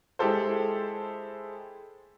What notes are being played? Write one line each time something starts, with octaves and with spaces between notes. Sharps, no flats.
G#3 E4 G4 A4 C5